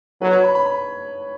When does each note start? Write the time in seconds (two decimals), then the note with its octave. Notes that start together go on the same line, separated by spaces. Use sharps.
0.22 F#3 B4
0.33 C#5
0.44 B5
0.55 B5
0.66 B5